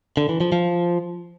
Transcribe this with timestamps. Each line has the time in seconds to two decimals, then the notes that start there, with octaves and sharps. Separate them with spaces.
0.17 D3
0.29 E3
0.41 F3
0.52 F3